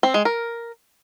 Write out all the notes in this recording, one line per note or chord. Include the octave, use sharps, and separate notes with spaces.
C4
G#3
A#4